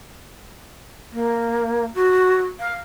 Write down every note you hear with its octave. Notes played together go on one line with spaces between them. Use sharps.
A#3
F#4
F5